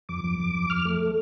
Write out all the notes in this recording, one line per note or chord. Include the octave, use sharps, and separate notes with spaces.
F2 D6
F2
F2
F2
F2 F6
A3